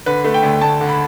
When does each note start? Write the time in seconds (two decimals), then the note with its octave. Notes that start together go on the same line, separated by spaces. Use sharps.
0.06 D3 B4
0.24 A3
0.34 G5
0.43 D2
0.61 D2 A5
0.81 D3
0.89 B5